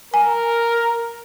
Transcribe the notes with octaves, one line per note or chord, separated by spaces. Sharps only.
A#4 G#5